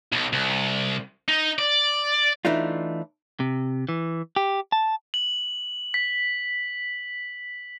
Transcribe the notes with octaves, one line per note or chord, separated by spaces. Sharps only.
B1
C2
D#4
D5
E3 A3 D4 D#4 F4
C3
E3
G4
A5
F#7
B6